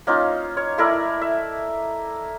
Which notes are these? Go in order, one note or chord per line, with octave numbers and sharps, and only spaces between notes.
A#3 C#4 D#4 F4
C#5
A3 E4 A#4 D5
E5